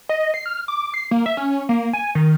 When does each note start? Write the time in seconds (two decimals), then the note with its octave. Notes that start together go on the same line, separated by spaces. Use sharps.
0.09 D#5
0.34 C7
0.46 F6
0.68 D6
0.94 C7
1.11 A#3
1.26 E5
1.37 C#4
1.69 A#3
1.93 G#5
2.15 D#3